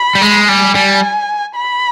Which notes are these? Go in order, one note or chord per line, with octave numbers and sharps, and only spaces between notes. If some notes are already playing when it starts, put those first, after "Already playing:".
Already playing: B5
G3
G#3
G3 G#5
G3
B5